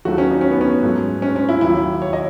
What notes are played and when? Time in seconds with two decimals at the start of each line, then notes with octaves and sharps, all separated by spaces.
0.05 D#2 D#3 F#3 A3 F#4
0.18 C#4
0.31 D#4
0.41 C#4
0.51 B3
0.61 C#4
0.83 G#2 F#3 A3
1.22 C#4
1.36 C#4
1.49 E4
1.61 D#2 D#3 F#3 E4
2.02 C#5
2.13 D#5